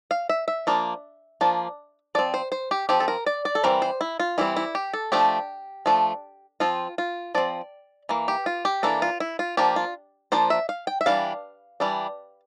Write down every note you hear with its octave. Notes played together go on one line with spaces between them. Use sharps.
F5
E5
E5
F3 A#3 D4
F3 A#3 D4
F3 C4 D5
C5
C5
G4
F3 C4 G4
A4
A#4
D5
D5
A4
E3 G3 C4 A#4
C5
E4
F4
E3 G3 C4 E4
E4
G4
A4
F3 A3 D4 G4
F3 A3 D4
F3 C4 F4
F4
F3 C4 D5
E3 A#3
G4
F4
G4
E3 A#3 D4 A4
F4
E4
F4
F3 A#3 D4 G4
F4
F3 A#3 D4 C5
E5
F5
G5
E5
E3 G3 D4 F5
E3 G3 D4